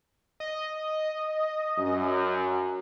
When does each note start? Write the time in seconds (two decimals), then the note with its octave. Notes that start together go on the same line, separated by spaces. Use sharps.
0.40 D#5
1.78 F#2